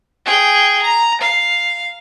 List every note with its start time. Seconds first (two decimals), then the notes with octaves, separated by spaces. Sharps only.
0.26 G#4 G5
0.82 A#5
1.21 F5